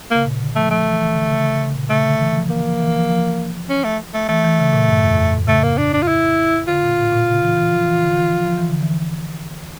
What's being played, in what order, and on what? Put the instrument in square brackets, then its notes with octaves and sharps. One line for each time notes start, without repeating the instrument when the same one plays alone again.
[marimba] C#3 [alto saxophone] A#3
[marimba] A#2
D3
[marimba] F3 [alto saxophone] A3
[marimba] F3 [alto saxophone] A3
[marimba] E3
E3
D3
C#3
C#3
C#3
A#2
[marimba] C#3 [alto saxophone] A3
[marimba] D3
E3
F3
[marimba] E3 [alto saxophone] A#3
[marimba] F3
E3
F3
F3
[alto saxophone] C#4
A3
A3
[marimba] E3 [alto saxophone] A3
[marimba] E3
C#3
A#2
G2
F2
F2
A2
[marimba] C#3 [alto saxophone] A3
[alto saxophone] A#3
D4
D4
F4
E4
[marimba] D3 [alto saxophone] F4
[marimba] A#2
A2
A#2
C#3
E3
E3
F3
E3
D3
E3
F3
F3
E3
D3
E3